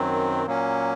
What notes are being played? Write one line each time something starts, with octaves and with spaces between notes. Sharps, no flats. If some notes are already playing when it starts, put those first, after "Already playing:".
Already playing: F#2 D#3 F#3 C4
A#2 F#3 A#3 C#4